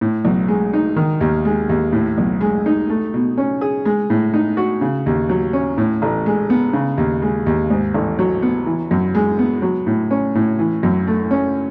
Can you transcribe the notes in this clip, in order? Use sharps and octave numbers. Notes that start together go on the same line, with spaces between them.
A2
B1
G#3
D#4
D#3
D#2
G#3
D#2
A2
B1
G#3
D#4
A3
B2
C#4
G#4
G#3
A2
D#4
F#4
C#3
D#2
F#3
C#4
A2
A1
G#3
B3
C#3
D#2
G#3
D#2
G#2
A1
F#3
B3
E3
F#2
G#3
B3
F#3
A2
C#4
A2
E3
F#2
A3
C#4